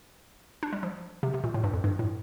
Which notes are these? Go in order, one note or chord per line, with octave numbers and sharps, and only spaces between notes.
D4
G3
F3
C3
C3
A#2
A2
G2
F2
G2
A2